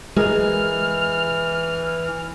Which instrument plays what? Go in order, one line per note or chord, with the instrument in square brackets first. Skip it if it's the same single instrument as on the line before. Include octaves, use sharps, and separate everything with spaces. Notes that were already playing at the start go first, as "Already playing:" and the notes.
[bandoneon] E3 [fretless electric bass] G#3 [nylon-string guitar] G#4 A#4 D#5 [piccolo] F6